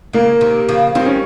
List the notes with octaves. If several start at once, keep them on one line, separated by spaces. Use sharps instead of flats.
C#3 A#3
C3 D#3
C#3 F3
D#3 G3 C4
C#4